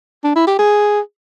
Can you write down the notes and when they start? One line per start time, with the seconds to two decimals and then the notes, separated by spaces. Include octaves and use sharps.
0.24 D4
0.36 E4
0.47 G4
0.59 G#4